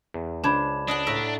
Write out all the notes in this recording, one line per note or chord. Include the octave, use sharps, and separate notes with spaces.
E2
C#2 D4 C5 B5 G#6 E7
D4 D#5 F#5 A5
A2 E5 A#5